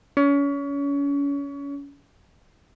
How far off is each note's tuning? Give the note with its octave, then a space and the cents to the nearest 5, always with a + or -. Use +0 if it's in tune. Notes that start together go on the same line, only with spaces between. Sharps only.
C#4 +30